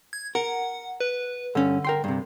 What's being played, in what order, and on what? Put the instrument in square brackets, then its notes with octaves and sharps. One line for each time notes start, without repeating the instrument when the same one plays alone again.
[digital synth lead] G#6
[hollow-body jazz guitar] A#4 [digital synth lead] F#5
[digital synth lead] B4
[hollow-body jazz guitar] G2 C#4 [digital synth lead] D3
[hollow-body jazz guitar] A#4 G5 C6
G2 C3